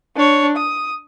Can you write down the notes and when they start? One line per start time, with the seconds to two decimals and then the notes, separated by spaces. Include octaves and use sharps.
0.16 D4 C#5
0.57 D#6